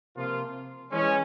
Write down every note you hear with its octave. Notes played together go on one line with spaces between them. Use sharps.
C3 F3 A#3 F4
E3 G#3 C#4